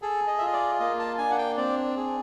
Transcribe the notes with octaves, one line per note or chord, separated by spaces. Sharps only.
G#4 A4
D#5
E5
F4
D#5
D5
A#3 D#5
A5
D4 G#5
F#5
G5
C4 D5
G#4